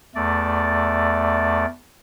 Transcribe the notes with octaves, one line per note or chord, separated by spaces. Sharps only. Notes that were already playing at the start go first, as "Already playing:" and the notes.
E2 A3 D5